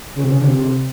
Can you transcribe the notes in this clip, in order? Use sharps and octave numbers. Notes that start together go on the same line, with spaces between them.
C#3
C3
C#3
D3
C3